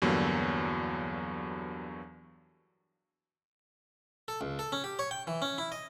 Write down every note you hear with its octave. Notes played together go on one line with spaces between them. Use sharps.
E2 G2 D3 F#3 A#3
A4
C#2
A4
C#4
G4
C#5
G5
E3
C#4
E4
D#5